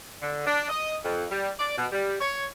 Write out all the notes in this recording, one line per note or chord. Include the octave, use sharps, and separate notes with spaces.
D3
D4
D#5
F2
G3
D5
B2
G3
C#5